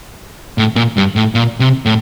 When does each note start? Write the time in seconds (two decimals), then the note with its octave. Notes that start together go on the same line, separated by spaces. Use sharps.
0.58 A2
0.76 A#2
0.97 G2
1.16 A2
1.35 A#2
1.60 C3
1.86 A2